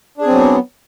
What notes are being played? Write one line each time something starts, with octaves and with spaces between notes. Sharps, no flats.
F#3 B3 C4 D4 G#4